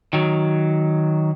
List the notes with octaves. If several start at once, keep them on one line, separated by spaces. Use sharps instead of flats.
D#3 F#3